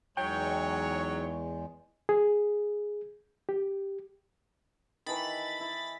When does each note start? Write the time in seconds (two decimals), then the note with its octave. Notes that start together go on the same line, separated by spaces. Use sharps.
0.17 E2 F#3 G#3 D#4 C#5 G5
2.09 G#4
3.49 G4
5.06 D#3 E3 A5 B5 A6
5.61 E4